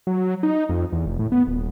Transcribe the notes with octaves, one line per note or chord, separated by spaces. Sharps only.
F#3
D#4
F2
E2
F1
A2
B3
D#1